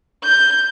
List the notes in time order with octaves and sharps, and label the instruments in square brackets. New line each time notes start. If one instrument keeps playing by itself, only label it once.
[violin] G6